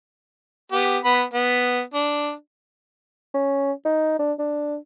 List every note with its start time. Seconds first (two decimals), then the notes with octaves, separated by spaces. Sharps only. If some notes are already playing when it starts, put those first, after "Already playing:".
0.72 B3 G4
1.05 B3 B5
1.34 B3
1.94 D4
3.34 C#4
3.85 D#4
4.19 D4
4.39 D4